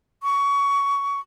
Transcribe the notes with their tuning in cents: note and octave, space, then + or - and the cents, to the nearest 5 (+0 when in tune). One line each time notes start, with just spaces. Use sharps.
C#6 +20